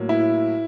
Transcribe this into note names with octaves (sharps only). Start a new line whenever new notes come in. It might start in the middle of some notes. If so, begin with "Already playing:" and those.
Already playing: A2 F#3 A#3
E4